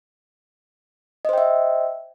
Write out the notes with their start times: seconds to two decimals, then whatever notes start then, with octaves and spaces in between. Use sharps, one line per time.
1.25 D#5
1.29 C5
1.33 G5
1.38 E5